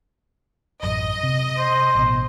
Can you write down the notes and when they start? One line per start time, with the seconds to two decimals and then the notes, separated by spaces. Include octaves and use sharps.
0.83 A1 F#2 D#5
1.23 C3
1.58 C5
1.95 A1 B2